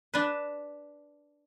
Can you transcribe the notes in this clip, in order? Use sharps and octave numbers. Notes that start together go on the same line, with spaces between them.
D4 B4